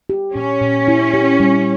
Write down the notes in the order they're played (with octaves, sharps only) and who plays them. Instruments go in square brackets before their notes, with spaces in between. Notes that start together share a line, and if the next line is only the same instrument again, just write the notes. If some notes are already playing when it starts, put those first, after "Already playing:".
[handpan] G4
[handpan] A#2 [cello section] C#4
[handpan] A#2
E4
G4
G3